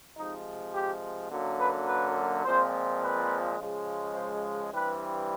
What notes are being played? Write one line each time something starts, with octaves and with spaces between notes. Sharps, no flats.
C3 F3 G#3 D#4
G4
F#2 D3 F#3 A#3
B4
B4
A#2 F3 G#3 C4 C5
B4
C#3 F3 G#3
C5
G2 E3 G3 C4 B4